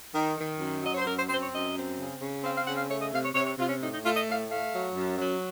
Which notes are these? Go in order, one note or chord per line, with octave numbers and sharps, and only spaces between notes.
D#3
D#3
F#2
F#3 D#5
C#5
C5
F#2 A#4
C5
C4 C5
C#5
F#2 D#5
C4
C#3
C#3
C4 F5
F5
C#3 F#5
F5
A3 C#5
D#5
C3 F5
C#5
C3 C#5
C#5
C3 F4
C#4
A2 D#4
D#4
A3 F4
D#5
A2 F5
A3 F5
F#3
F#2
F#3